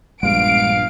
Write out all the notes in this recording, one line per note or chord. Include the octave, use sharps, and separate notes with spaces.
A#1 G2 G#3 B3 F5 D7